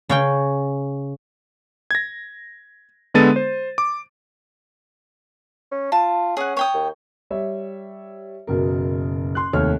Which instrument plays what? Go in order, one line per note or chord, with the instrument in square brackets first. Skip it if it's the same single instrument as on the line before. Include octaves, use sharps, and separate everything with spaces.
[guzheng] C#3 C#4 G5
[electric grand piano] G#6 A#6
D3 G#3 B3 A4 A6 D#7
C5
D6
[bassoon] C#4
[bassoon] F4 [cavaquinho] A5
[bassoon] C#4 [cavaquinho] G#4 F#5
[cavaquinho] C#5 G5 D#6
[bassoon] D#2
[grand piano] G3 C#5 E5
F#1 B2 A#4
C6 F#6
F1 D#2 A3 C#5 F6